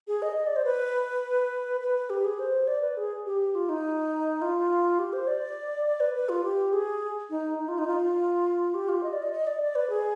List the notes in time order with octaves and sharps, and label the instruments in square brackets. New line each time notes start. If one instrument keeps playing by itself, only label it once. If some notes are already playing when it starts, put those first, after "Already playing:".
[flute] G#4
D#5
D#5
D5
C5
B4
B4
G4
G#4
C5
D5
B4
G#4
G4
F4
D#4
F4
G4
C5
D5
D5
B4
B4
F4
G4
G#4
D#4
D#4
F4
D#4
F4
G4
F4
D#5
D5
D#5
D#5
D5
D5
B4
G#4